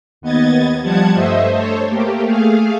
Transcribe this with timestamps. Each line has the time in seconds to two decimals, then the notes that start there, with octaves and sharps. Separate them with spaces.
0.21 D#2 B3 D#5 G#6 A6
0.81 F3 G3 F#5 A5 G#6
1.15 G2 A3 C5 D#5 E5
1.52 A4 C5 C#5
1.88 A3 A#3 G4
2.24 A3 G#4 F5